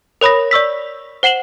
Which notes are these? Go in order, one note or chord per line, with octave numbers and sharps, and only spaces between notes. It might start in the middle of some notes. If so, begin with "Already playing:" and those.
A#4 C#5 B5 D#6 A#6
D5 C#6 E6 B6
C5 F#5 C7 E7 F#7